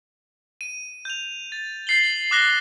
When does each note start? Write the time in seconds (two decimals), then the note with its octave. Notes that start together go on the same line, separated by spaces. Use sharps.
0.61 D#7
1.05 G6 F7
1.52 A6
1.87 G6 A6 C7 F#7 G7
2.31 D6 D#6 F#6 A#6 B6 G7